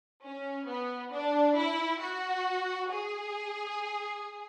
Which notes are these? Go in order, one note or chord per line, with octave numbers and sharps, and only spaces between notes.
C#4
B3
D4
E4
F#4
G#4